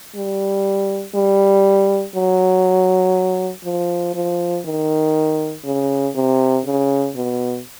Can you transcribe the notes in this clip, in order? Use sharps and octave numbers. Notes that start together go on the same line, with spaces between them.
G3
G3
F#3
F3
F3
D#3
C#3
C3
C#3
B2